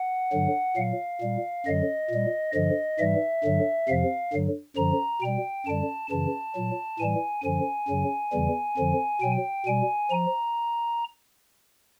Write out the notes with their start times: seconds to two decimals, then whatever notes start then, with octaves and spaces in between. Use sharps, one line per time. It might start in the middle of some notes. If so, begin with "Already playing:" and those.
Already playing: F#5
0.32 G2 D3 F#3
0.77 A#2 F#3 F5
1.21 A#2 G3
1.66 F#2 D3 F#3 D#5
2.10 A#2 G3
2.54 G2 D3 F3 D#5
2.99 G#2 E3 G3 E5
3.44 G2 D3 F#3
3.88 F2 C3 F3 F5
4.33 G2 D3 F#3
4.76 F#2 D3 F3 A#5
5.21 B2 G3 G5
5.66 F#2 D3 G3 A5
6.11 F#2 C#3 E3 A5
6.55 A#2 F#3
6.99 A2 E3 G3 G#5
7.44 F#2 D3 F3 G#5
7.88 F#2 C#3 F#3
8.32 E2 C#3 E3 G3
8.77 F2 D3 F3
9.21 B2 F#3 G5
9.66 B2 G3 G#5
10.11 F3 A#5